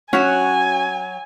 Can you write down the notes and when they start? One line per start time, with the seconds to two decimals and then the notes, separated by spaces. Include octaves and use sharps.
0.13 F#3 C#4 F#4 G#5